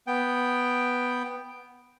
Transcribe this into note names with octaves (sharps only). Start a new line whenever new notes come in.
B3 G5